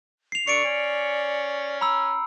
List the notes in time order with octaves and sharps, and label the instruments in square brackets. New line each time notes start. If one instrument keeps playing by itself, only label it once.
[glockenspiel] C7 F7
[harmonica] D3 C#6 [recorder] D5 [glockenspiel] C#7 D7
[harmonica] C#4
[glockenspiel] A#5 B5 E6